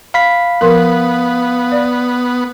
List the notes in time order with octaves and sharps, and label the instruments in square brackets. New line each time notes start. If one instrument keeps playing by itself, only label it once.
[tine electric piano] F5 B5 B6
[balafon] F3 A#4 [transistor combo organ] B3
[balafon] D5